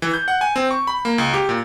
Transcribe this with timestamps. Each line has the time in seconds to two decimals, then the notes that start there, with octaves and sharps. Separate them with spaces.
0.02 E3
0.14 G6
0.28 F#5
0.41 G#5
0.56 C4
0.71 C#6
0.87 B5
1.05 A#3
1.18 C#2
1.34 G4
1.49 A#2